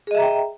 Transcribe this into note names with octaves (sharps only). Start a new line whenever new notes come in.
G#4 D#5 E5 G5 A#5